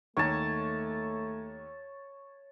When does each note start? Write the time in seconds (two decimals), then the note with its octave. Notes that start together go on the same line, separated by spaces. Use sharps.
0.17 D#2 A3 C#5 A5